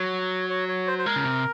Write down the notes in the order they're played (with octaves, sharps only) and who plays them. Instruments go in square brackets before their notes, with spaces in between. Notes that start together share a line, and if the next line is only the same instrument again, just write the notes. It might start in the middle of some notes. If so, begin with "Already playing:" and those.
Already playing: [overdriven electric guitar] F#3 [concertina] C#5
[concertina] C#5
C#5
C5
C5
[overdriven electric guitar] G#3 [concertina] A#4
[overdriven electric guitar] C#3
C3